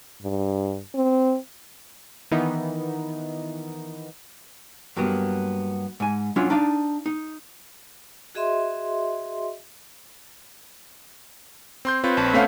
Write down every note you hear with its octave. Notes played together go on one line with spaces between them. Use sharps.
G2
C4
D#3 E3 B3 D#4
G2 F#3 A#3 B3
G#2 G#5
F#3 C#4 D4 F4 C#5
D4 D#4 D5 F5
D#4
F#4 G#4 D#5 E5 C6
C4 C6 G6
C4 F4 B4 C#5
A#1 A5
A3 B3 C#4 F5 F#5 B6